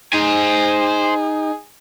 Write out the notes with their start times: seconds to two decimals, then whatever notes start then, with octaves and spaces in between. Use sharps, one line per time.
0.13 D#4 G#4 C5 G#5